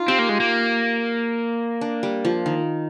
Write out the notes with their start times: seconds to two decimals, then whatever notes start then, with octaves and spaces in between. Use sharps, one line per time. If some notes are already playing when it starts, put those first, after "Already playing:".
Already playing: D#4 F4
0.08 C4 G4
0.19 A#3
0.29 G#3
0.40 A#3
1.81 D4
2.03 G3
2.25 F3
2.46 D#3